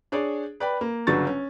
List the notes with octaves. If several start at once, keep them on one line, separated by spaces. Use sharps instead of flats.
D4 G#4 C#5 D5
B4 D5 G5 B5
A#3
G1 C#3 F#3 D4 C#6 A6
C#4